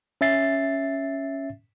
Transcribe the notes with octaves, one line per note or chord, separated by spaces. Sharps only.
C#4 E5 A6 C7